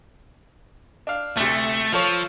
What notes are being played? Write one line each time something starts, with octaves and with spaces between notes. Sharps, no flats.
D4 F5
D2 C3 A3
F3 F4 A4 C#5